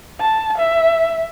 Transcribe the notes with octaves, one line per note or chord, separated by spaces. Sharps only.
A5
E5